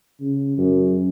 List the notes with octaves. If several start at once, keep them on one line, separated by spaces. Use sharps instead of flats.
C#3
F#2